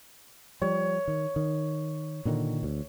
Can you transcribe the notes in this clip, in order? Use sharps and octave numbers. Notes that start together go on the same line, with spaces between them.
F3 G3 C#5
D#3
D#3
A#2 D3 D#3
D2